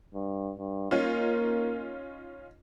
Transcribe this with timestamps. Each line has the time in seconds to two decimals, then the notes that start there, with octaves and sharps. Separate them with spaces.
0.14 G2
0.58 G2
0.91 A#3 C#4 D#4 F4